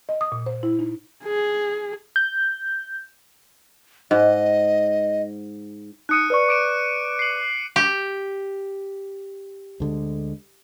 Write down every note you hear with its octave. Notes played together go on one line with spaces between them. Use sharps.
D#5
D#6
A#2
C5
E4
D#4
G#4
G6
G#2 D#5
D#4 D#6 F#6 C#7 D#7
B4 D5 C#6
D6 D7 D#7
C7 F#7
G4
D2 D3 G#3